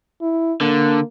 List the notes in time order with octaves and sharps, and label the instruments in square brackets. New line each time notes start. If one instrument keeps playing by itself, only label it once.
[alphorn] E4
[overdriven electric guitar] D3 [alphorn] A#3